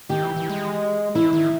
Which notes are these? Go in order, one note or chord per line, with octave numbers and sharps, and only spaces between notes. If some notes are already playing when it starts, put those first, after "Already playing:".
D#3 G4
E3
E3
G#3
E3 E4
D#3